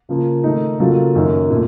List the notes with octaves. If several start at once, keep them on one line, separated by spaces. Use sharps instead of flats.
C#3 F3 A#3
D#3 A3 D#4
C#3 F#3 A#3 F4 A4
F#2 D#3 A#3 C#4
A#2 A3